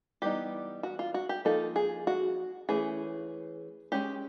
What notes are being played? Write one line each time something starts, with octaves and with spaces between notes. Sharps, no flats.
E3 G3 B3 D#4 G4
F#4
F4
F#4
G4
F3 A#3 D#4 A4
G#4
F#4
E3 A3 C#4 G#4
G#3 C#4 G4